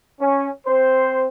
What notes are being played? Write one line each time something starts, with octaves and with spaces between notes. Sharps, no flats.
C#4
C4 C5